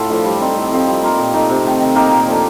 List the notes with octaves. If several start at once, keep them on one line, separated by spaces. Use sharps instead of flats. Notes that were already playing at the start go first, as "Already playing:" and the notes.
Already playing: A2 F4 A4
F3 A3 D4
G3
C4 D#4
A2
F3 A3 C4
G3
A#3 F4 A#4
A#2
A3 D#4
C3
D#3 A3
D#3
A#3 D#4 A#4
A#2
F3 A3 D4